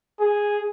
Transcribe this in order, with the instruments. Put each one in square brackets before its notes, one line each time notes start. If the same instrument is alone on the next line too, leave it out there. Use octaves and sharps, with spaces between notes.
[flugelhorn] G#4